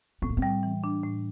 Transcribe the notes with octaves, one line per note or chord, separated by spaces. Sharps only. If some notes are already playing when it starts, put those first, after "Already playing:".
A2 C4
A#3
C4
G3
E3
D4
A2